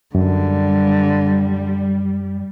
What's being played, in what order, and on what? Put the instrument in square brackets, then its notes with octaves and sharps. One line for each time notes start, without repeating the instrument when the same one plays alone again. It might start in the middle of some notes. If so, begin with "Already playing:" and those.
[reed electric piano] F#2 [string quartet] D3 [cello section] G3